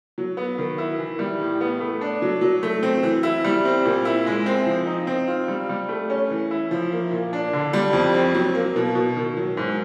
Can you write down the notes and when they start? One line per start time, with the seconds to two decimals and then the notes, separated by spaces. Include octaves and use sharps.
0.18 F#3
0.37 B3
0.58 D#3
0.78 E4
0.99 E3
1.19 G3
1.40 A2
1.61 B3
1.80 A3
2.01 D4
2.22 F#3
2.41 F#3
2.63 A3
2.83 C4
3.03 E3
3.23 E4
3.44 G3
3.65 C4
3.85 A#2
4.05 E4
4.26 G#3
4.46 C4
4.66 F3
4.87 D#4
5.07 C4
5.28 F4
5.48 G3
5.69 G3
5.89 A3
6.10 C#4
6.30 E3
6.51 E4
6.71 F3
6.92 A#3
7.11 A#2
7.33 D4
7.53 D3
7.73 G3
7.93 F2
8.14 C4
8.35 F#3
8.55 A#3
8.76 B2
8.95 B2
9.16 D#3
9.37 F#3
9.57 G#2